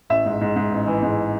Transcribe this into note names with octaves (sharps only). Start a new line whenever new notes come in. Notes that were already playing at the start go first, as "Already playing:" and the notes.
A1 E5
G#2
G#2
G#2
A1
E3
G#2